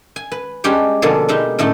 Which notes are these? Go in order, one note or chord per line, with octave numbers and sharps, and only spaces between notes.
G#5
B4
G3 G#3 C#4 D4 G4 C#5
B2 D3 F3 A#3 G#4 A4
G3 G#3 D#4 E5
A2 D3 A3 C#4 D#4 A5